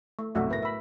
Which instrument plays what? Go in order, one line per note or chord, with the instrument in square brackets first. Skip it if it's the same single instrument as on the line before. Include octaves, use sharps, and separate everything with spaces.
[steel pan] A3
[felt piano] B1 A2 C3 [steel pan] A3 F#4 E5
[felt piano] A2 A#4 A#6 [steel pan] B4
[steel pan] E5 B5